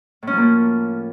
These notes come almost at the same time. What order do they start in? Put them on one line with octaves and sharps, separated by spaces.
A2 C#4 F3 A#3